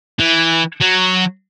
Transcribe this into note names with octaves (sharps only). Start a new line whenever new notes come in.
E3
F#3